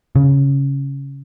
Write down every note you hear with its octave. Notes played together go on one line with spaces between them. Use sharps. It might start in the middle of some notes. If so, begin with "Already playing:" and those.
C#3